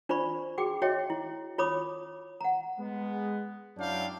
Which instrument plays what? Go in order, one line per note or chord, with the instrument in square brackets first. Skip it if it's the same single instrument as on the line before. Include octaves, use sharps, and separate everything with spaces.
[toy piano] D4 F4 C5 D5 B5 C#6
F#4 G#4 G5 D6
F#4 C#5 D#5 E5 G5
E4
F4 C#5 B5 D6 D#6
F#5 A#5
[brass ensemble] G#3 B3
F#2 F#3 D4 E4 F5 G5